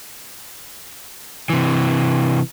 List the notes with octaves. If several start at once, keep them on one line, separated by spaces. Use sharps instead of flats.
C3 E3